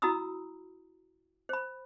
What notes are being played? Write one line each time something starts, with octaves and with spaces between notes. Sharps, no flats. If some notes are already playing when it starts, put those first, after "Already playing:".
E4 F#4 A#5 B5 D#6 E6
C5 B5